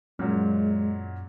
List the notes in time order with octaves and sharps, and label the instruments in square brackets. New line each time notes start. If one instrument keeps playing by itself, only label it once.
[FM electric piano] F#2 [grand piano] A#2 F#3 [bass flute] G#3